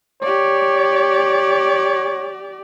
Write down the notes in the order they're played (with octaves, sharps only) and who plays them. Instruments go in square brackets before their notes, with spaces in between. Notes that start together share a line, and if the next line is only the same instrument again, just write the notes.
[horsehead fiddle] G4 D5 [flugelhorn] C#5